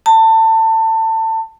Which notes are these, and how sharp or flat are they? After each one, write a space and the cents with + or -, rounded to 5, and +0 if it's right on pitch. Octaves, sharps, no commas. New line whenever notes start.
A5 +25